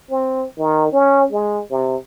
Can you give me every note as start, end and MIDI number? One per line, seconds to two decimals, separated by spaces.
0.11 0.45 60
0.59 0.91 51
0.92 1.27 61
1.32 1.60 56
1.71 1.96 48